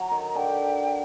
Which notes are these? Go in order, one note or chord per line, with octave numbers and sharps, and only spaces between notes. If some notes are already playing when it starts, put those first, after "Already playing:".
Already playing: F#3 A#5
D#3
D3 G5